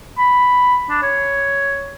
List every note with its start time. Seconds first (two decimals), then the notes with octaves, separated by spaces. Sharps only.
0.18 B5
0.89 D4
1.02 C#5